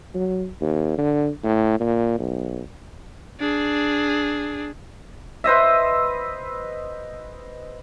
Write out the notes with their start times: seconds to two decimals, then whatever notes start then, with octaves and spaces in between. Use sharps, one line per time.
0.15 F#3
0.61 D#2
0.98 D3
1.44 A2
1.80 A#2
2.19 B1
3.40 D4 G#4
5.44 B4 C5 D#5 E5